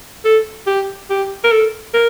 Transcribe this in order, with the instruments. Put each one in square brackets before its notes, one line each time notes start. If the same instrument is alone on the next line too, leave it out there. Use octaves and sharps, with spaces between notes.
[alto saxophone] A4
G4
G4
A#4
A4
A#4